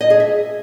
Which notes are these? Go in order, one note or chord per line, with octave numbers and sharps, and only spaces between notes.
D#5
G#4
E5